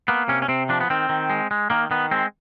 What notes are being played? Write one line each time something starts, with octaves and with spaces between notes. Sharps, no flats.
A#3 B3
C3 C#4
C#4
C3 C4
F3 D4
B3
D#3 C4
D#3
G#3
G#3
D#3 A#3
D#3 B3
G#3 C4